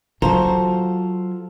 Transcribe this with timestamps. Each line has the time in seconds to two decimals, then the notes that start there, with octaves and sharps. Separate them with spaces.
0.22 F#3 F4 F#4 A4 C5 A#5